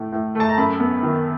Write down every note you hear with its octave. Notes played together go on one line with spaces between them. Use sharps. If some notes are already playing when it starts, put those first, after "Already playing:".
Already playing: A2 A3
A2
A3 A5
A#5
F#2 B5
B3
D#3